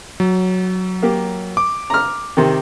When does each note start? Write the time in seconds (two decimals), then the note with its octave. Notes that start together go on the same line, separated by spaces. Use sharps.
0.20 F#3
1.03 A#3 G4
1.57 D6
1.90 A#5 F6
2.37 C3 D#3